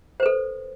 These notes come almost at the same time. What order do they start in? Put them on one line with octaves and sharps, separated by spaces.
C5 B4 A4